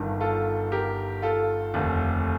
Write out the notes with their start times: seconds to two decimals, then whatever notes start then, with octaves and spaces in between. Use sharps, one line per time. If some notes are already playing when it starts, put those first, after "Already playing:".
Already playing: G1 G2 D#3
0.21 F4 A4
0.72 G4 A#4
1.22 F4 A4
1.74 F1 D#2 D3